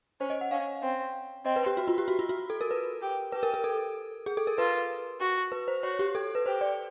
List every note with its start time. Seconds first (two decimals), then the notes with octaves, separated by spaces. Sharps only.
0.20 C#4 C5
0.30 D#5
0.41 F#5
0.51 C#4 F5
0.83 C4
1.45 C4 D#5
1.56 B4
1.66 G4
1.77 F#4
1.88 F4
1.98 G4
2.08 F#4
2.19 F4
2.29 F#4
2.50 A4
2.61 A#4
2.71 B4
3.02 G4
3.32 G4 B4
3.43 A#4
3.54 A#4
3.64 A4
4.26 G#4
4.37 A4
4.47 A#4
4.58 F4 B4
5.21 F#4
5.52 B4
5.68 C5
5.83 F#4 C#5
5.99 G4
6.15 A4
6.35 B4
6.46 G4 C5
6.61 D5